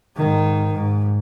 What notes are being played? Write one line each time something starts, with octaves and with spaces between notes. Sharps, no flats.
G#2 D#3
G#2